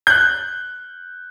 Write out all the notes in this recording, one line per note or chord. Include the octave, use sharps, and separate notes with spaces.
F#6 G6